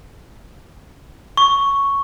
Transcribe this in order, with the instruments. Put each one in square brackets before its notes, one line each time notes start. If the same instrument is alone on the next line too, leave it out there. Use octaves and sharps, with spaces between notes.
[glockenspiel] C#6